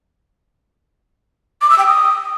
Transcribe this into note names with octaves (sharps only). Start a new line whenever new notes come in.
D6
E6
G5
D#6